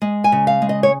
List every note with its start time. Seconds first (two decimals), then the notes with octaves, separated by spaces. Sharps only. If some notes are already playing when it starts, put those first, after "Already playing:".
0.02 G#3
0.24 G#5
0.32 C#3
0.47 F5
0.62 G#3
0.69 D#5
0.83 C#5